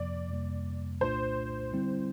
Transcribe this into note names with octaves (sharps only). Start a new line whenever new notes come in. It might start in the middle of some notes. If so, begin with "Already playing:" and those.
Already playing: F2 C3 F3 A#3 D5
F2 C3 G3 A#3
C2 A#2 A3 D4 F4 C5
D3 G3 C4 E4